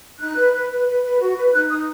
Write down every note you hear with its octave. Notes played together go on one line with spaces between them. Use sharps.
D#4 F#6
B4
B4
B4
B4
B4
F#4
B4
D#4 F#6
D#4 D#6